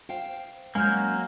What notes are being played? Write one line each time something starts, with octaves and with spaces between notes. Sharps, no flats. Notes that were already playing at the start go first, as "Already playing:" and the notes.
C5 F5 G5
F#3 G#3 A#3 C#4 G#5 F6 G6